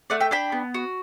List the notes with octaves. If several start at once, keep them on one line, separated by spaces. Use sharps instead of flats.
A3 D5 F#5
E5 G5
D4 G5 B5
B3
F#4